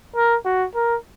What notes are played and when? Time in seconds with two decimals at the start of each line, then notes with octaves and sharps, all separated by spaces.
0.16 A#4
0.45 F#4
0.75 A#4